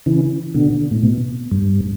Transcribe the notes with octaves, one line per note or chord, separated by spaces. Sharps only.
C#3 E3
B2 D3
A2
B2
G2